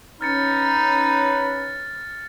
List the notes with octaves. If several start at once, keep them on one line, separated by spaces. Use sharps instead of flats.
C#4 D#4 B4 F6 A6 C#7